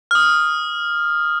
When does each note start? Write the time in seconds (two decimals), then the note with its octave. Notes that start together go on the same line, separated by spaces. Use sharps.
0.11 F6
0.15 D#6